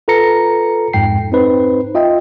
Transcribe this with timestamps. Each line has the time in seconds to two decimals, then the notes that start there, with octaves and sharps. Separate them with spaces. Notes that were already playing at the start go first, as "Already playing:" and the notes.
0.08 F4 A4 B4 A#5 A#6 C#7
0.93 F2 G#2 G5 C7
1.32 C4 D#4 B4 C5
1.95 F4 D#5 E5 G5